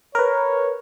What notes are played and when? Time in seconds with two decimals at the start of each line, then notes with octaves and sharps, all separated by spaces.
0.15 A#4 B4 C#5